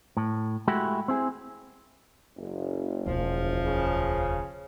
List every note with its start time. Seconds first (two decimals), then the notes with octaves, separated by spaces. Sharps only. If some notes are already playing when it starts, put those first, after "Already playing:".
0.17 A2
0.68 G#3 A3 E4 F#4 G4
1.08 C4 E4 G#4
2.38 F#1
3.06 E1 D2 F3
3.65 C#3